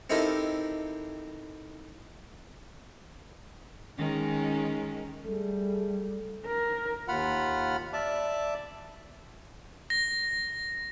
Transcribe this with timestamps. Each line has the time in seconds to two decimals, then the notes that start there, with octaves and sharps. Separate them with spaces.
0.10 C4 D#4 E4 G4 A4 A#4
3.98 D#3 G#3 C#4
5.26 G3 A3 G#4 A4
6.46 A#4
7.08 D#2 F4 F#5 B5 F6
7.93 D5 E5 A5 D6
9.90 A#6